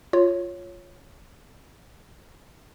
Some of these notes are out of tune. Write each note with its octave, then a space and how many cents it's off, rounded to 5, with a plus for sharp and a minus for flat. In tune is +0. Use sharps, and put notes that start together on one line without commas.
F4 +0 C#5 -5